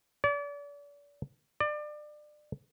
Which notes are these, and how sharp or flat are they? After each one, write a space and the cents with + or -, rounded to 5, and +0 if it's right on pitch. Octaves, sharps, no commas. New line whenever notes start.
D5 -35
D5 +30